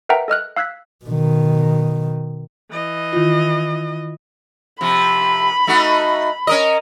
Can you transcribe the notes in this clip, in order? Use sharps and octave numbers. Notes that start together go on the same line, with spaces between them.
A#4 B4 E5 F#5 G5 A#5
A4 D#5 F6 F#6
F5 E6 F#6 G#6 B6
B2 D#3
E3 D#5
D#3 E4 F4
C3 F3 B5
A3 D#4 F#4
C#4 A#4 D#5